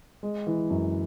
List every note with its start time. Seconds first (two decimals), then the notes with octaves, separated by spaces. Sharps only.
0.23 G#3
0.47 E3
0.70 F#2